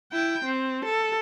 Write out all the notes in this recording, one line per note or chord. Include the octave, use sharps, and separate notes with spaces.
E4 G5
C4
A4